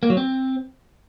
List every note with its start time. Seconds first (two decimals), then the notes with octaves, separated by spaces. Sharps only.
0.03 A#3
0.10 F#3
0.17 C4